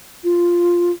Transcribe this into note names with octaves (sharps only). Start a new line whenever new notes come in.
F4